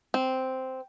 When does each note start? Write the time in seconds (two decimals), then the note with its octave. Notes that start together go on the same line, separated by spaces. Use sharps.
0.14 C4